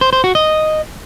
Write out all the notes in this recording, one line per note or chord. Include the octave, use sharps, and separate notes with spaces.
C5
C5
F#4
D#5